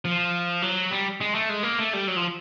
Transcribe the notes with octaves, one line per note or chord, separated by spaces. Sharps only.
F3
F#3
G3
G#3
A3
G#3
A#3
A3
G3
F#3
F3